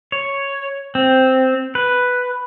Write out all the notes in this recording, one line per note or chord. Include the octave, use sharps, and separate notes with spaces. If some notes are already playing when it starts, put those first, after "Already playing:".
C#5
C4
B4